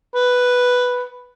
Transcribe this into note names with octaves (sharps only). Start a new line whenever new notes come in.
B4